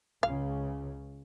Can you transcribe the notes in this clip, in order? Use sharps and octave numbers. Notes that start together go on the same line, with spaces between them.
C#2 C#3 F5